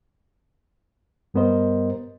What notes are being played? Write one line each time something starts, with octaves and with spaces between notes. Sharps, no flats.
G2 G3 B3 A#4 C5 D#5